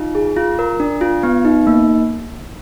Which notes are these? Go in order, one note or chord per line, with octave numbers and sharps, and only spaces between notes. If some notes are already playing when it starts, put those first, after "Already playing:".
Already playing: D#4 F4
G#4
F4
A#4
D4
F4
B3
D#4
A#3